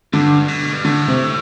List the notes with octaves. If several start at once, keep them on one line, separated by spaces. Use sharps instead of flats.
G2 D3
B2
G2
A2 D3
C3